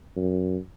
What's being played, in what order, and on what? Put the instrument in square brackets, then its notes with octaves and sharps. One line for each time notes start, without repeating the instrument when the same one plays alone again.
[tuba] F#2